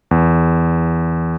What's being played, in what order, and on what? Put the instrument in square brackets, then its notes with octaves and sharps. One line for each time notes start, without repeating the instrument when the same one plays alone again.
[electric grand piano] E2